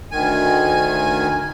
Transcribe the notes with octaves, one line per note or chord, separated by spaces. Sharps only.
D2 D#3 G#5